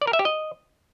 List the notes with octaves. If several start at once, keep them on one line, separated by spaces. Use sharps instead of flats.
D5
A#4
E5
G4
D#5